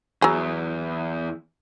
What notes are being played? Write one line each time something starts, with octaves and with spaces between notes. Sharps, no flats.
E2 F#3 G#4